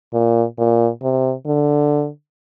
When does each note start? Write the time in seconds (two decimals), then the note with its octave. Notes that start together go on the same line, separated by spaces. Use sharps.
0.14 A#2
0.59 A#2
1.03 C3
1.46 D3